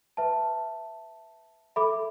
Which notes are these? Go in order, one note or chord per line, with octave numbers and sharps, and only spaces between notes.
B4 E5 A5
A4 E5 B5 D6